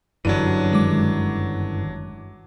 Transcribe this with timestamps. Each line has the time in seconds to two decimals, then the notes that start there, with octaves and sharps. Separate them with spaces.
0.25 G1 F#2 E3 F#3 D4 D#7
0.71 D#3 G#3 D6